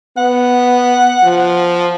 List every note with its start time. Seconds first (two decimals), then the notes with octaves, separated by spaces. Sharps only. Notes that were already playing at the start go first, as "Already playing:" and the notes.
0.18 B3 F#5
1.23 F3